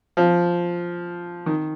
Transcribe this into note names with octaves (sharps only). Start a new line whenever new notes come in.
F3
D#3